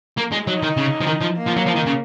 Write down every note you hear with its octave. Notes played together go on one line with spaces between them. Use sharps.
A#3
G#3
F#3 D#4
D#3
C#3
F3
D#3
F3
A#3
F3
F#3
F3
D#3
C#3